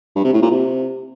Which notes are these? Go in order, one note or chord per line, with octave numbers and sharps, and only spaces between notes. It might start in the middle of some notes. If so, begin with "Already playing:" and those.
G2
C3
A2
A#2
C3